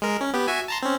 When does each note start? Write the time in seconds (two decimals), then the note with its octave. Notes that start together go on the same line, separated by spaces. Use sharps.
0.02 G#3 A#4
0.21 C#4
0.34 B3 G4
0.47 F#4 E5 G#5
0.68 A5 A#5 C6
0.83 C4 C#4